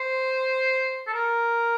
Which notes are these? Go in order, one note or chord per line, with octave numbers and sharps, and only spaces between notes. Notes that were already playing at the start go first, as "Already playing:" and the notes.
Already playing: C5
A4
A#4